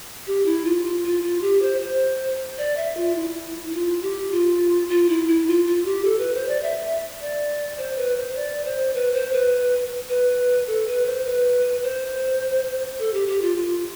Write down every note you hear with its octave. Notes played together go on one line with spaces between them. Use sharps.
G4
E4
F4
F4
F4
F4
G4
C5
C5
D5
E5
F4
E4
E4
F4
G4
F4
F4
E4
E4
F4
F4
G4
A4
B4
C5
D5
E5
D5
C5
B4
C5
D5
C5
B4
C5
B4
B4
A4
B4
C5
B4
C5
A4
G4
G4
F4
F4